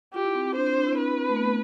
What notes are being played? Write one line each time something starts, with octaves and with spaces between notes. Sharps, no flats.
F4 G4
E4
C4
C4
D4 C5
C4
D4
E4
C4
D4 B4
E4
C4
A3
B3
A3